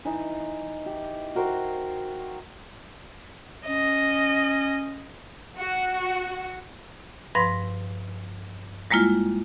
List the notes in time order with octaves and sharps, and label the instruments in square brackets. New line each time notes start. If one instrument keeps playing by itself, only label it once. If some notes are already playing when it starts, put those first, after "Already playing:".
[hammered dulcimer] E3 D#4 D#5 E5
G4
F#4 A#4 C5 G5
[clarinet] C#4 [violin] D#5
[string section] F#4
[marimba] G2 F3 B4 C6 A#6
G3 G#3 A#3 E4 F4